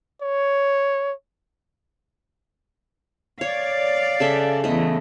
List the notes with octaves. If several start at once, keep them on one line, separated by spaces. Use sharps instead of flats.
C#5
C#5 D5 F5
C#3 A4 E5
E2 A3 D#5